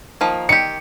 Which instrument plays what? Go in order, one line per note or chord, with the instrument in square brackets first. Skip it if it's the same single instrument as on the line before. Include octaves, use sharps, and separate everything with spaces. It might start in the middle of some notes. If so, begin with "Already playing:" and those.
[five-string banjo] D#3 F3 A#3
[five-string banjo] D#3 G4 [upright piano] C#7